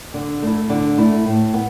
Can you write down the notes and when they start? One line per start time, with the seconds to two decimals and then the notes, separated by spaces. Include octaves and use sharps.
0.14 D3
0.42 A3 E4
0.70 D3
0.98 A3 E4
1.26 A2
1.54 B3